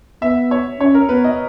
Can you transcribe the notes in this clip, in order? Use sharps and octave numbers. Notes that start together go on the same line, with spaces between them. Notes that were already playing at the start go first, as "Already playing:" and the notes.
B3 E5
C#5
C#4 C#5
A#4
B3 B4
D#5